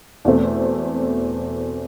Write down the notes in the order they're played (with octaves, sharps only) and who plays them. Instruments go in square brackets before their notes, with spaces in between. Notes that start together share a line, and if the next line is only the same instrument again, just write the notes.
[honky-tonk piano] E2 B2 A3 C4